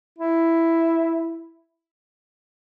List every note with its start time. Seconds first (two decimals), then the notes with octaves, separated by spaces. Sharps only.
0.18 E4